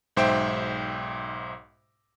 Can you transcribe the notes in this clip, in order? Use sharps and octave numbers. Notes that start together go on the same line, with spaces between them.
B1 G#2 C5 E5 G5 D7